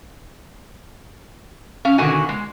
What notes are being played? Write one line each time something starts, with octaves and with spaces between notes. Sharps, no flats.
C#4 F5
B2 D3 D#3 F#4 G#5
G#3